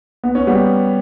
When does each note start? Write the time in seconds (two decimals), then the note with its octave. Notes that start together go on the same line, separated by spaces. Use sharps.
0.24 B3
0.35 C#4
0.47 G3 B3